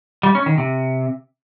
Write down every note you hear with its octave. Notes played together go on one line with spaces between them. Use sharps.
G3
C#4
D#3
C3